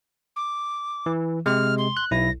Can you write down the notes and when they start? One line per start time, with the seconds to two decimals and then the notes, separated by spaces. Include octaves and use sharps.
0.36 D6
1.06 E3
1.46 C3 G#3 F6
1.78 C6
1.97 F#6
2.11 B1 E4 A#6